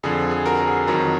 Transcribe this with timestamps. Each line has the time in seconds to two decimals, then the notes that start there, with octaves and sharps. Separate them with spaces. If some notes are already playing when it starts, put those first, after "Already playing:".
0.03 F2 D3 F3 G#4
0.31 G#4
0.46 F#4 A#4
0.61 A#4
0.67 G#4
0.87 F2 D#3 F#3 F#4 A#4